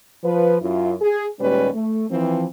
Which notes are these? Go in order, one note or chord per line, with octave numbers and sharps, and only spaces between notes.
F3 B4
F#2 E4 F4
G#4
D#2 A#2 G3 G#3 C#4 B4
A3
E3 F3 C4